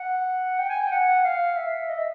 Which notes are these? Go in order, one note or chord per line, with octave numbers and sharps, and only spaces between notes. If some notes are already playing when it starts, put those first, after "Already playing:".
Already playing: F#5
G5
G#5
G5
F#5
F5
E5
D#5
E5